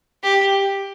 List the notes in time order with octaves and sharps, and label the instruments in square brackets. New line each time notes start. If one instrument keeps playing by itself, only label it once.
[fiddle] G4